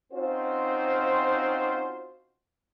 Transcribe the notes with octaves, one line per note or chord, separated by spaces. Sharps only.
C4 C#4 D#4 F4 F#4 C5